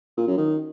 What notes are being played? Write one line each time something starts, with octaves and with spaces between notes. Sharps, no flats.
A#2
F#2
D#3